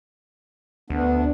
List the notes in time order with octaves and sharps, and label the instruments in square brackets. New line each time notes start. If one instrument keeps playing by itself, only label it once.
[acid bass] D2 [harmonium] B3 D4